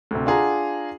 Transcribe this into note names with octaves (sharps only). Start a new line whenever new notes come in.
D2 C3
D4 F4 G#4 F#5 A#5